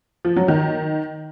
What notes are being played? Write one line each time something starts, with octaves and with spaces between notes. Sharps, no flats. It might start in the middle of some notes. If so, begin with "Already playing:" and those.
F3
F#3
D#3